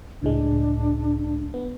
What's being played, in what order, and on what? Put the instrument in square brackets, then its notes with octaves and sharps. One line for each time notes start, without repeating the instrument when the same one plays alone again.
[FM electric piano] C#2 A2 G#3 [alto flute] D4
[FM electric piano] B3